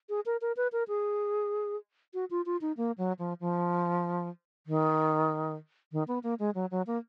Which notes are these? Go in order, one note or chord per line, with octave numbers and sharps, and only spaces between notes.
G#4
A#4
A#4
B4
A#4
G#4
F#4
F4
F4
D#4
A#3
F#3
F3
F3
D#3
D#3
B3
A#3
G#3
F#3
F#3
A#3